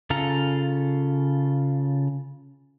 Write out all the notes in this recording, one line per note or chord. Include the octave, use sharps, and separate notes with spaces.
C#3 F4 A4 A#5